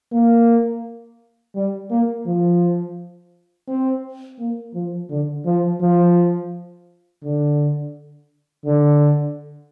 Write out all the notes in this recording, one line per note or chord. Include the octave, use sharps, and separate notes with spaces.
A#3
G3
A#3
F3
C4
A#3
F3
D3
F3
F3
D3
D3